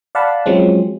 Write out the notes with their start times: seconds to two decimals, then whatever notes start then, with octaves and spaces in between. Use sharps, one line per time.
0.15 D5 F5 F#5 A5 B5
0.46 F3 F#3 G#3 C4 C#4